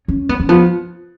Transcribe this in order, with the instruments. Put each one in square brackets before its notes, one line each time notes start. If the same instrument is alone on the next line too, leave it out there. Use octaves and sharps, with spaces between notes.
[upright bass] C#4
B3
C#4
[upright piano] F3 [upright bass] B3